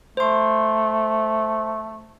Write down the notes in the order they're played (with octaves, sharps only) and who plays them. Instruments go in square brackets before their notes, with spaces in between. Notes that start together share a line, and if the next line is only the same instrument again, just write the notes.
[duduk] A3 [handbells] C5 C6